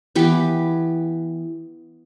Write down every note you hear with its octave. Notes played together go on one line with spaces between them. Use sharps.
E3 B3 G4